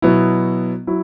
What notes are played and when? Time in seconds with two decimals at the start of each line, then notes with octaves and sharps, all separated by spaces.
0.02 B2 F#3 B3 E4
0.87 F#3 E4